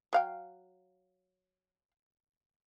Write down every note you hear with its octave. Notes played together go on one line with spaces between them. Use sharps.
F#3 F5 G5